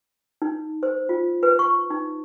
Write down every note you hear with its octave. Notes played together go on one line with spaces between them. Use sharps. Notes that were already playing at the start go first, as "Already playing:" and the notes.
D#4
C5
F4
B4
C#6
D#4